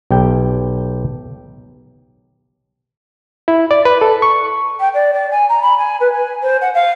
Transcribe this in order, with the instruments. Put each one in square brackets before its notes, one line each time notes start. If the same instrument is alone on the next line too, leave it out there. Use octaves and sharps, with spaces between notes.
[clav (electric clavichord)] B1 G4 G5
[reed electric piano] E4
D5
B4
A4
C#6
[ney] G5
D5
D5
G#5
A#5
B5
G#5
B4
G#5
C5
F#5
F5